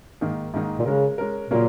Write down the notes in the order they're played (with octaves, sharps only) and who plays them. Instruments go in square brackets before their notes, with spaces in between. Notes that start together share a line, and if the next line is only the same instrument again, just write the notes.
[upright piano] G#2 D#3 A#3 D#4
G#2 D#3 A#3 D#4
[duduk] A#2
[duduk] C#3 [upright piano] G#3 C#4 A#4
[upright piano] G#3 C#4 A#4
[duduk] A#2 [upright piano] C#3 F#3 A#3 C#4 A#4